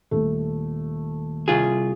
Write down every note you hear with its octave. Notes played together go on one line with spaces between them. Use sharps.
D#1 A3
C2 F4 G#4